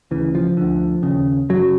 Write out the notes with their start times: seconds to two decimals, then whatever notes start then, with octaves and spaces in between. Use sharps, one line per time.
0.11 D2 C#3 E3
0.35 F3
0.57 D2 D3
1.03 D#2 C#3
1.49 F#2 C#3 F#3